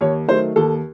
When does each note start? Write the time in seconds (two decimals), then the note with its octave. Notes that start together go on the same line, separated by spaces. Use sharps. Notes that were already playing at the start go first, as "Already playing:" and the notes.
0.01 D#2 C#5
0.28 D#3 F#3 A3 C5
0.56 D#2 A4